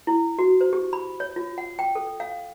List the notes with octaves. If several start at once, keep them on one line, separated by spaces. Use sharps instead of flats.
E4
F#4
C5
G4
B5
C#5
F4
F#5
G5
A4
F5